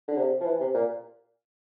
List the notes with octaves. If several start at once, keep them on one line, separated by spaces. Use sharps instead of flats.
D3
C3
F3
E3
C3
A#2